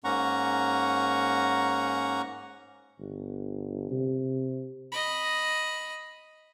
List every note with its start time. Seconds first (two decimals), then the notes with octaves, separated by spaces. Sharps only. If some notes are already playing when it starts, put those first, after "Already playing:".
0.04 G#2 A#3 C#4 F#5 A#5 C#6
2.99 G1
3.91 C3
4.92 D#5 B5